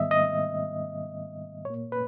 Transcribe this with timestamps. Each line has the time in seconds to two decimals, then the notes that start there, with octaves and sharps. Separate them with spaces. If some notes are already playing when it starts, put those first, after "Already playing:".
Already playing: G#2 D#3 G3 B3 D#5 E5
0.11 D#5
1.65 A#2 A#3 C#5
1.92 B4